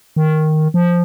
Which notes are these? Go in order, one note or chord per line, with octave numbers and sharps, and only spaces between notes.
D#3
F3